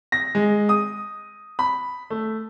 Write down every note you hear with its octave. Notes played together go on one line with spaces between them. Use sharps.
A#6
G#3
D#6
B5
A3